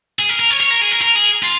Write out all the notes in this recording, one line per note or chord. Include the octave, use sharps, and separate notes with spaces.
G#4
A#4
A#4
C#5
C#5
A#4
G#4
A#4
A#4
G#4
F4